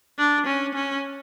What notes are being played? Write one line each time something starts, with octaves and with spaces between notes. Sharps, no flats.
D4
C#4
C#4